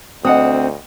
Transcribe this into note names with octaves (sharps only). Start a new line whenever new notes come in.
D2 C4 D#5 F#5 D#6